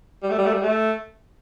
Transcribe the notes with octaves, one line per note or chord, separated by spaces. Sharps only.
G3
A3
G3
A3
G3
A3